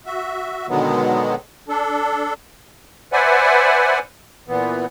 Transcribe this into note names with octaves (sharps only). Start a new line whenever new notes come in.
F#4 E5
B2 D3 D#3 F#3 G#3 B3
D4 A4
B4 C5 D5 E5 F#5 G#5
A#2 E3 B3